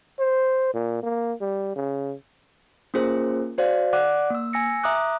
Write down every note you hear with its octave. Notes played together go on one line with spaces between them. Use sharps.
C5
A#2
A#3
G3
C#3
A#3 C#4 F4 G#4 A#4 C5
F#4 C5 D5 F5
D5 F#5 D6 F#6
A#3 E6
G#5 E6 A#6 C#7
E5 A#5 D6 D#6 F#6